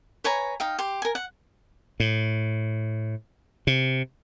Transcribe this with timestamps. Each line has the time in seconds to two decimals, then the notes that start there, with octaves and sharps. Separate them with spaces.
0.24 B4 C#5 G#5 A#5
0.60 D#4 F5 G5
0.79 G4 C6
1.02 A#4 G#5
1.15 F#5
2.00 A2
3.67 C3